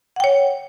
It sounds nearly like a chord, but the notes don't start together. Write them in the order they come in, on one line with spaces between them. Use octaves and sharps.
F#5 G5 C#5